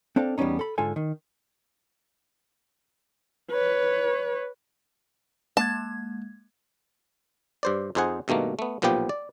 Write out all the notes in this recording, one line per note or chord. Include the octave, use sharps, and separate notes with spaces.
C4 D4 A4 F5
E2 G3 B3 C#4 D#4
A4 B5
G#2 D3 F4 A4 G#5
D#3
B4 C#5
G#3 A#3 A5 G#6
G2 C5 D5
F2 D#4 G#4 C5 F#5 G#5
G2 B2 D#3 A3 A#3
A3 B3
B1 A#2 F3 B3 G4 G5
D5